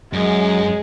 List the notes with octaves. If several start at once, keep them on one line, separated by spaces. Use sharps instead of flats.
F#2 G#3